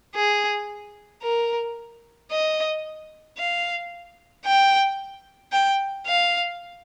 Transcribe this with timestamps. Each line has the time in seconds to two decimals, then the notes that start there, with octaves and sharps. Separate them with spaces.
0.15 G#4
1.23 A#4
2.31 D#5
3.38 F5
4.45 G5
5.52 G5
6.07 F5